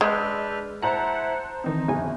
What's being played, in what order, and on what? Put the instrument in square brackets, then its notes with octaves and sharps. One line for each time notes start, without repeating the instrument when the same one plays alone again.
[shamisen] G#3 [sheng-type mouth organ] D4 B4 F6 [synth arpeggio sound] E6 G6
[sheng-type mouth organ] E4 F#5 [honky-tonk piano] C5 A5 A#5 [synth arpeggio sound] F#6 C#7
[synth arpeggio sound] D#3 E3 C4 [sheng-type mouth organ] D#4
[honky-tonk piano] G1 [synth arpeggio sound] F2 G#5